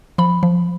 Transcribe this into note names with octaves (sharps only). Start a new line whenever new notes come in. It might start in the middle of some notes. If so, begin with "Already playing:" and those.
F3 B5
F3